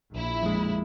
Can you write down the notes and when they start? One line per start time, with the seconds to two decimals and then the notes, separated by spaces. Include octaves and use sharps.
0.11 A#1 E4
0.43 F2 G#3